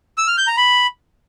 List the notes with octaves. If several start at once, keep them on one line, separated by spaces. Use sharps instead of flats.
E6
F6
G6
A#5
B5